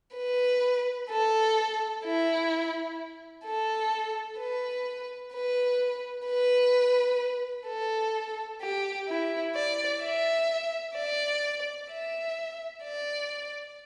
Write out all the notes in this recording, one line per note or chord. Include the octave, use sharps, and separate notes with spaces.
B4
A4
E4
A4
B4
B4
B4
A4
G4
E4
D5
E5
D5
E5
D5